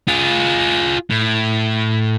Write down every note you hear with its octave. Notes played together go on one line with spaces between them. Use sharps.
F4 G#4
A2